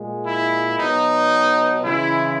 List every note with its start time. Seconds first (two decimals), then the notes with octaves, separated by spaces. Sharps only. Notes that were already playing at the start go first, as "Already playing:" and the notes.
Already playing: A#2 G#3
0.27 E4
0.79 B2 F#3 D#4
1.84 C#3 E3 G#3 E4